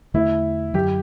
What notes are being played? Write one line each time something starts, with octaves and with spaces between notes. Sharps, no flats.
E2 D3 A3 E4
F#2 D3 F#3 G4